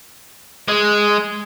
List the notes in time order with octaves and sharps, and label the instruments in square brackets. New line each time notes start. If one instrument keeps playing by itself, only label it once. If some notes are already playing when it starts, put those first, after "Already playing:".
[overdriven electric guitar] G#3